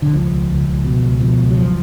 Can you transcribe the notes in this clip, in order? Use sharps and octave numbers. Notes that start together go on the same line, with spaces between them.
D3
C#2 F3
C#2
C#2
C#2
B2
C#2
B2 F3
C#2
F#3
F#2 F3